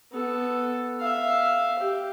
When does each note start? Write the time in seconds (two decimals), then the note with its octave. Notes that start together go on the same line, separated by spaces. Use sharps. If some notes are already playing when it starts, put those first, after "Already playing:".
0.12 B3 A4
0.99 E5 F5
1.79 G4